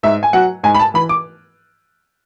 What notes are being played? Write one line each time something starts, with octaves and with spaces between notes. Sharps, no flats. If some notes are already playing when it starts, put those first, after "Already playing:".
G#2 E5
G#5
F#3 F#5
G#2 G#5
B5
A5
E3 B5
D6